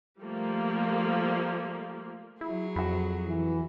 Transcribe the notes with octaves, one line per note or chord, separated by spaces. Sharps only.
F3 G3 A3 A#3
F#3 E4 G#4
F2 F#4 B5
E3